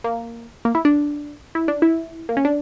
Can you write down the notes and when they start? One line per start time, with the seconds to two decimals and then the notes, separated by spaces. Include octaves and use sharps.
0.04 A#3
0.65 A#3
0.75 E4
0.85 D4
1.55 E4
1.68 D4
1.82 E4
2.29 A#3
2.37 C#4
2.45 D4